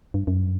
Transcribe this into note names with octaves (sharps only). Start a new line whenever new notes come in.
G2
F#2